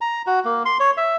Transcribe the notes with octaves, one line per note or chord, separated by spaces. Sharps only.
A#5
F#4
A#3
C6
C#5
E5